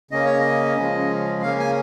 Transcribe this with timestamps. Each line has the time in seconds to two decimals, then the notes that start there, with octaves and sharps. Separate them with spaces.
0.11 C#3 A#3 C#4 D#5
0.25 C#5
0.39 D#5
0.77 C#3 F3 G#3 C#4
1.42 C#3 A#3 C#4 F5
1.59 G#5